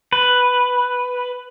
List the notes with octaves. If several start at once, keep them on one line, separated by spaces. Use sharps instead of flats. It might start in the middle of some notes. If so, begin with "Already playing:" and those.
B4